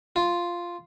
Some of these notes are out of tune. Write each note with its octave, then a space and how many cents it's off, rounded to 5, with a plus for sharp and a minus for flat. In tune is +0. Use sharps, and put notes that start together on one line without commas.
F4 -5